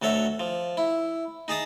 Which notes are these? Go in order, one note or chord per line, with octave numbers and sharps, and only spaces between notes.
D2 F#3 A4 C#5 E5
F3
E4
D#4 G#4 A5 D#6